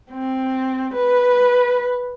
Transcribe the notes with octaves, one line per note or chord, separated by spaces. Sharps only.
C4
B4